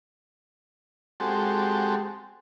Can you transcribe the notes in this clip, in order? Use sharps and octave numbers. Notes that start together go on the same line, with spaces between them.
G#3 C4 F#4 G4 A4